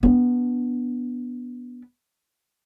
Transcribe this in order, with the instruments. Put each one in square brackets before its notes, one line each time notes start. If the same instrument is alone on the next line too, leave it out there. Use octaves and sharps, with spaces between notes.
[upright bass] B3 D4